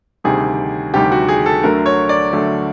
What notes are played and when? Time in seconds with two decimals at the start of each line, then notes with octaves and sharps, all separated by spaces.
0.24 D2 C3 D#3 G3 G#4
0.94 D2 C3 D#3 G3 G4
1.12 F#4
1.29 G#4
1.46 A4
1.63 D2 D3 F#3 A3 A#4
1.86 C#5
2.09 D5
2.33 D2 D3 F#3 A3